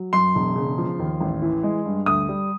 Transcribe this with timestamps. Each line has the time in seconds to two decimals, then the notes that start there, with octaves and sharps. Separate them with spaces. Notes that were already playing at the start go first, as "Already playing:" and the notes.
Already playing: F#3
0.13 F#2 C6
0.35 E1
0.55 C#3
0.78 F3
0.99 D#2
1.21 A1
1.42 E3
1.63 G#3
1.85 G2
2.06 D2 D#6
2.29 G3